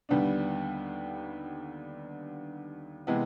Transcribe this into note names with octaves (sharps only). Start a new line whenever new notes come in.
D#2 D3 G3 B3 D4
C3 E3 G#3 B3